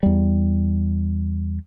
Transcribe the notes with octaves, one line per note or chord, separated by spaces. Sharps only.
E2 G3